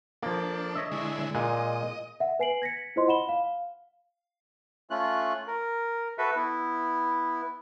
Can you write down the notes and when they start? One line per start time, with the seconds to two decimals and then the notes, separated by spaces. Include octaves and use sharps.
0.23 F3 A#3 D4 A4
0.75 C#5 D#5 E5
0.92 D3 G#3 E4
1.35 A#2 G#3 D#5
2.20 E5 F#5
2.39 B4 G#5 C7 D7 F#7
2.62 G#6 A#6 B6 C#7
2.96 E4 F4 C5 D#5 C6
3.08 F#5 B5 E7 G7
3.29 F5
4.90 A3 C#4 F4 F#6
5.47 A#4
6.18 F#4 A4 B4 E5
6.36 B3 E4